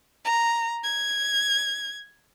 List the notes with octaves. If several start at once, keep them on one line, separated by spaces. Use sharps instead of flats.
A#5
G#6